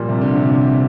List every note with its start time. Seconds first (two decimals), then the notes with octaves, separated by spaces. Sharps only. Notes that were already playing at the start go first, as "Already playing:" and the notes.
Already playing: A#2 F3 G3
0.09 C3
0.21 D3
0.35 C3